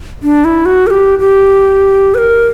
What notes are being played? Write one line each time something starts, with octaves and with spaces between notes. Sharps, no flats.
D4
E4
F#4
A#4
G4
G4
B4
A#4